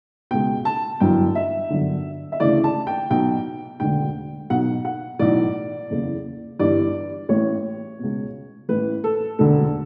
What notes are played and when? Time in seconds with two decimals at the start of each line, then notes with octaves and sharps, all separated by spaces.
0.31 C#2 B2 G5
0.65 A5
1.00 G1 F#2 E3 G5
1.35 E5
1.70 G1 F#2 D3
2.32 E5
2.40 D2 C#3 E3 D5
2.64 A5
2.87 G5
3.10 B1 B2 G5
3.80 E1 D2 D3 G5
4.50 B1 B2 F#5
4.85 F#5
5.19 B1 A2 E3 D5
5.90 F#1 E2 C#3 E3
6.59 G1 G2 E3 D5
7.29 A1 A2 E3 C#5
7.99 C#2 B2
8.69 A1 A2 E3 B4
9.04 A4
9.39 E1 D2 D3 A4